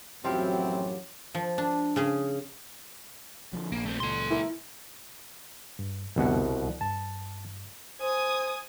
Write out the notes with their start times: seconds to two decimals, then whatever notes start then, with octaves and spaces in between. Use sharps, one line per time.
0.24 A1 F#2 F3 F#3 C4 E4 G4
1.34 F3
1.58 D4
1.96 C#3 C#4 G#4
3.53 D3 F3 F#3
3.72 A#1 A#3
3.86 A3 C4
4.00 C#2 A#2 A4 C6
4.31 E4 A#4
5.79 G2
6.16 C2 F2 B2 D3 B3 F#5
6.54 C#2
6.81 G2 A5
8.01 C5 G#5 D#6